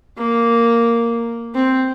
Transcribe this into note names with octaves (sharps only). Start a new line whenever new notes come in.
A#3
C4